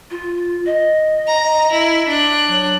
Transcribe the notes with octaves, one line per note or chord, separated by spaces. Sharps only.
F4
D#5
A#5
E4
D4 F#6
F#3